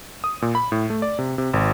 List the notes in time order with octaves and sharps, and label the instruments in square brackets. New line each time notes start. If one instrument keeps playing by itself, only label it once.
[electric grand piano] D#6
A#2
B5
A2
A3
D5
C3
C3
G#1